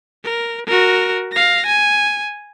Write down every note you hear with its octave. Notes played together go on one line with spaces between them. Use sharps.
A#4
F#4 A#4
F5 A#6
G#5